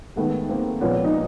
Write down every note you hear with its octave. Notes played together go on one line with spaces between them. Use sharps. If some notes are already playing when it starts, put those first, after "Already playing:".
G#2 D#3 A3 B3
A#3 C4
A#2 F3 B3 C#4
D#4